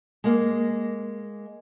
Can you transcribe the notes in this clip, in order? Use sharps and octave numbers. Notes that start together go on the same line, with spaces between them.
G#3 A#3